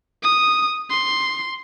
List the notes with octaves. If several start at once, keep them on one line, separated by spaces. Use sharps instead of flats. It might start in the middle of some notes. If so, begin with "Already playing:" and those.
D#6
C6